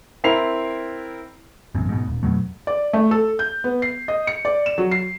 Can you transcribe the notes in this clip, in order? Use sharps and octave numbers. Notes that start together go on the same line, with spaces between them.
C4 E4 A#4 C7 F7
A1 F#2 B2
G#2 B2
D#1
F2 B2 F#3 A3
D5
A3
A4
G6
B3
C7
D#5
C#7
D5
E7
F#3
C7